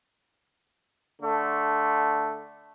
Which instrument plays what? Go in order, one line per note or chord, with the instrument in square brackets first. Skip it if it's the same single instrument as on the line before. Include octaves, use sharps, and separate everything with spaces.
[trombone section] D3 A3